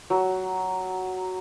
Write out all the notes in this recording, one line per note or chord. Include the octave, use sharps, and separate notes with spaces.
F#3